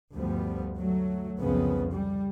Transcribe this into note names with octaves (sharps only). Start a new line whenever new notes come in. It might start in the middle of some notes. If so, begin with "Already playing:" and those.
D2 G2 F3 G3 B3
F#3 A3
C2 F2 C#3 B3
G3